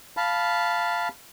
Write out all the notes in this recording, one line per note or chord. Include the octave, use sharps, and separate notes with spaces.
F5 A5 B5